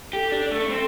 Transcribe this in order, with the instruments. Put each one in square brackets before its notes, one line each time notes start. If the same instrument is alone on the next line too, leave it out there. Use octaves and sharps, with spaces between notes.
[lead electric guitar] G4 [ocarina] A4
[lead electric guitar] D4
A3
C4